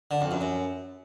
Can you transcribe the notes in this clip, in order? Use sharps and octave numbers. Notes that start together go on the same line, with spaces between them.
D3
F2
F#2
F#2